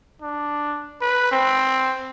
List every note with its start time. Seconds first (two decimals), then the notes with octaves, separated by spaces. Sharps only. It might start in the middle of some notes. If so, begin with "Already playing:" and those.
0.22 D4
1.02 B4
1.32 C4